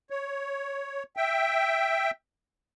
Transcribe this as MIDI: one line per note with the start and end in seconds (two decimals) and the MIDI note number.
0.10 1.03 73
1.17 2.11 76
1.17 2.11 79